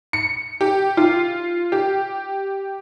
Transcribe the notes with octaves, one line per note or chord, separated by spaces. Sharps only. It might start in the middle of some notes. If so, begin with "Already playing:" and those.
C#7
G4
F4
G4